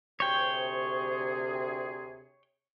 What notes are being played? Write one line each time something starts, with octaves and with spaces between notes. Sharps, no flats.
D2 C3 G#4 C#5 G5